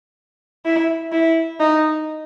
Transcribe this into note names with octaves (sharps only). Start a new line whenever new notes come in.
E4
E4
D#4